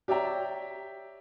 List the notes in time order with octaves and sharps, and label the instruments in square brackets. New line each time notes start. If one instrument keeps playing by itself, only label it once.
[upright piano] G4 C#5 D5 E5 G5 A#5